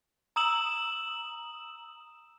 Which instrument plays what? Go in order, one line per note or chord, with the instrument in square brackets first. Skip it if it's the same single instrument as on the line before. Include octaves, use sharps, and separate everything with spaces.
[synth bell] A#5 D#6 E6 E7 F#7